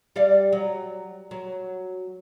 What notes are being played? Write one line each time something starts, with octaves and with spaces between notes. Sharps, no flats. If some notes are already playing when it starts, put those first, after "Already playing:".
G3 D5 F5
F#3
F#3